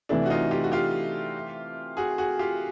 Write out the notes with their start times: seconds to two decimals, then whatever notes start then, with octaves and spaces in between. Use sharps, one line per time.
0.09 C3 E3 A3 D4 E4
0.26 F#4
0.30 D#4 F4
0.51 F4 G4
0.64 F#4
0.72 F4 G4
1.97 F#4 G#4
2.18 F#4 G#4
2.39 F4 G4